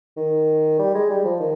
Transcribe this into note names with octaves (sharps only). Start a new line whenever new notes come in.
D#3
G3
G#3
G3
F3
D#3